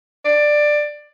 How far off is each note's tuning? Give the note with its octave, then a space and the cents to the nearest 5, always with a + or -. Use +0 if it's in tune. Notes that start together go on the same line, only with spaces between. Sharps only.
D5 +15